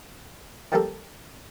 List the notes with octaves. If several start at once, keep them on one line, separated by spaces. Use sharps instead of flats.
D#3 F3 G3 A#3 G4 A4